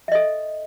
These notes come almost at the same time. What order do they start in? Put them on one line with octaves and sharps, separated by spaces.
E5 D#5 A4